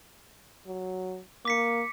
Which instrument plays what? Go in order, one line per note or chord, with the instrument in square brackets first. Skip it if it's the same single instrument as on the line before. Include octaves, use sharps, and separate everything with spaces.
[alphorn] F#3
[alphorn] A#3 [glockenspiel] D6 B6 C#7